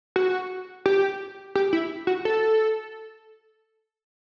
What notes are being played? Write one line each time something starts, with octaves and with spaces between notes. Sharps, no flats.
F#4
G4
G4
E4
F#4
A4